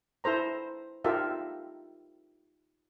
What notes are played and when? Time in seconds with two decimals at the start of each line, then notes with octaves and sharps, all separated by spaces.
0.24 E4 A4 C5 A#5
1.04 D#4 F4 G4 A4 A#4 E5